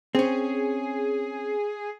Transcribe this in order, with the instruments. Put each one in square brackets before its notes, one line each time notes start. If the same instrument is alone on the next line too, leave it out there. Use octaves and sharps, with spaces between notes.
[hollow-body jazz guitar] C4 C#4 [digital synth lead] G#4